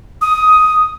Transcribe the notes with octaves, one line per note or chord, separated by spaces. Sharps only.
D#6